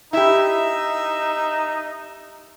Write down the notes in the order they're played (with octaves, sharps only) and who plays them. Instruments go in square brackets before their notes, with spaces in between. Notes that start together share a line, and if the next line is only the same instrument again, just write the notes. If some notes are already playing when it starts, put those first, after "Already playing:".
[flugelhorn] D#4 [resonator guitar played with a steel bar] E4 G4 [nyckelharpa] E5